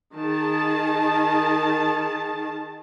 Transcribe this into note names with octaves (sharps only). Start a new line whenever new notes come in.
D#3 G#4 A5